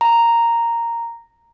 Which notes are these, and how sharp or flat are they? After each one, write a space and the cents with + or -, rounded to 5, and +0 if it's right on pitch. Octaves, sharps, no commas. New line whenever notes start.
A#5 -5